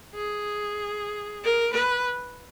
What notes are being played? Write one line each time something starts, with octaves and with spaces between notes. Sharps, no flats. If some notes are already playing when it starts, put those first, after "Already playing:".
G#4
A#4
B4